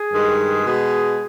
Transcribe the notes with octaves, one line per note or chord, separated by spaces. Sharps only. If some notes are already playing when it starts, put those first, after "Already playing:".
Already playing: G#4
G2 D#3 G#3
B2 G#3